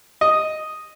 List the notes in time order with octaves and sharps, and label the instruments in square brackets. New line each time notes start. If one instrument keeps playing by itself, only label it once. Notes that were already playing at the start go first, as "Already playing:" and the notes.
[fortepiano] D#5